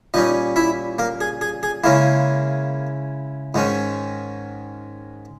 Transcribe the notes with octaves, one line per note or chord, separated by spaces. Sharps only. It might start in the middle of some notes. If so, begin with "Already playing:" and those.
A#2 G3 C#4 D#4 D#5
E4 E5
A#3 A#4
G#4
G#4
G#4
C#3 G#3 A#3 C#4 E4 A#4
G#2 D#3 G#3 C#4